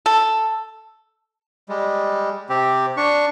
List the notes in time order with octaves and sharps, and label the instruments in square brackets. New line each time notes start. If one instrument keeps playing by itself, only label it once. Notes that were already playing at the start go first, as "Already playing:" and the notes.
[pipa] A4
[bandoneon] G3 G#3
C3 C4 G4
D4 C#6